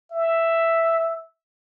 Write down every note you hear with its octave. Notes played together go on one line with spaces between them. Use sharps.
E5